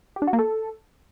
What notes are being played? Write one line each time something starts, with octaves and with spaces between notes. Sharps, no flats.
G4
D4
F#4
A#3
A4